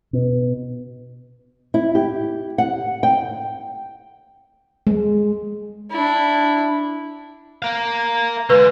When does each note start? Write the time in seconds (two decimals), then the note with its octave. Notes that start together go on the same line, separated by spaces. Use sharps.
0.13 B2
1.74 E4
1.95 G4
2.58 F#5
3.03 G5
4.87 G#3
5.91 D4 E4
7.62 A#4 F5
8.50 D3 G#3 B4